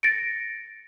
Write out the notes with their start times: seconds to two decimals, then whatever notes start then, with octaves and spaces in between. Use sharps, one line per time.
0.03 A6 A#6 C#7 D7